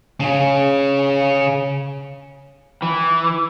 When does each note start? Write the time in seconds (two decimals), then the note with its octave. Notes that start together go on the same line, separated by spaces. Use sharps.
0.20 C#3 C#4
2.82 E3